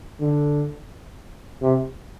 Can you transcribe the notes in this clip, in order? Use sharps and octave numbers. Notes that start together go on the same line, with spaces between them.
D3
C3